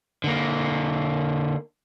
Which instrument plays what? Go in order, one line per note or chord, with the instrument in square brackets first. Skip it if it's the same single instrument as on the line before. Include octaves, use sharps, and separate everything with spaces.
[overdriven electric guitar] D3 A#3